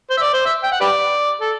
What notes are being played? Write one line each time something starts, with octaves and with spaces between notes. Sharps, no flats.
C5
E5
D5
C5
E5
G5
F#5
G4 B4 D5
A4